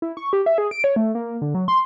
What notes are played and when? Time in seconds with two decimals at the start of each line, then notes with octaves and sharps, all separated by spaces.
0.02 E4
0.17 C#6
0.33 G4
0.46 E5
0.58 G#4
0.71 D7
0.84 C#5
0.96 A3
1.15 A#3
1.42 D3
1.55 F#3
1.68 C6